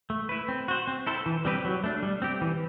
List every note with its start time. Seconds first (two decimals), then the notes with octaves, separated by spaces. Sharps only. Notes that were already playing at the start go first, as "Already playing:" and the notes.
0.10 A3
0.29 E4 B4
0.48 C4
0.68 F#4 C5
0.87 C4
1.07 E4 A4 C5
1.26 E3
1.45 G3 C4 G4 B4
1.65 F#3
1.84 A3 D4
2.03 G3
2.22 C4 G4
2.41 E3